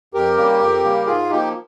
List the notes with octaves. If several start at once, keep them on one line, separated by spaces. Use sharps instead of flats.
F2 G4 A#4
C#3 G3 A#3
F2
C#3 G3 A#3
G#2 F4 G#4
F3 A#3 D#4 G4